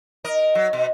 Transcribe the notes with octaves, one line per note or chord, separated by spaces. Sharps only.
A#4 D#5
F#3
B2